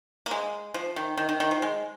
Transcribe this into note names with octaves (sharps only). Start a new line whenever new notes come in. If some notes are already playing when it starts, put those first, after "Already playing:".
A#3
G#3
F3
D#3
D#3
D#3
D#3
F3
G#3